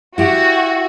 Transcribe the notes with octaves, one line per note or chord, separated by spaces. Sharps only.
E4 F#4 G4